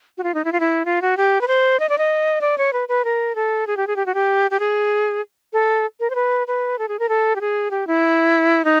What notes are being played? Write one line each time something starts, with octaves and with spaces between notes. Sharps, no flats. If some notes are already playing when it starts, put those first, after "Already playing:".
F#4
F4
D#4
E4
F4
E4
F4
F#4
G4
B4
C5
D#5
D5
D#5
D5
C#5
B4
B4
A#4
A4
G#4
G4
G#4
G4
F#4
G4
G4
G#4
A4
A#4
C5
B4
B4
A4
G#4
A#4
A4
G4
G#4
G4
E4
D#4